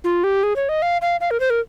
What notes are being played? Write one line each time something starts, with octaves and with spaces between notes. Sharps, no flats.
F4
G4
G#4
C#5
D#5
F5
F5
F5
A#4
C5
A#4